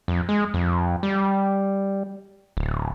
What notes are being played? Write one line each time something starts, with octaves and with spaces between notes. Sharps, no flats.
F2
G#3
F2
G3
D1